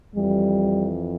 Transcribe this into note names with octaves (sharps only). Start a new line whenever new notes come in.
F2 E3 G3